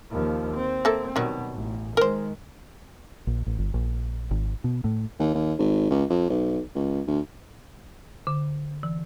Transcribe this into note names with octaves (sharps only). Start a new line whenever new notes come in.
D#2 F3
C4
A#3 A4 E5
B2 D#3 F#3 G3
A1
D#3 G#3 A#4 C5
A#1
A1
G1
A#1
G#1
B2
A2
D#2
D#2
G#1
C#2
F2
B1
C#2
D2
D3
E3